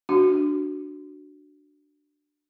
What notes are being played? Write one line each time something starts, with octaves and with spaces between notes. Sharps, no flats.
D4 F#4